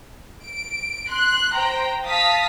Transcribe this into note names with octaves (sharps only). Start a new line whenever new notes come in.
D7
C6 F#6
C5 G5 A#5
F5 A5 D#6 A#6 B6